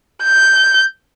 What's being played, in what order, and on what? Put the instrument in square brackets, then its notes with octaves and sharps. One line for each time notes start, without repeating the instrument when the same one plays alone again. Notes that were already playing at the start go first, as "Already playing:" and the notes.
[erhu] G6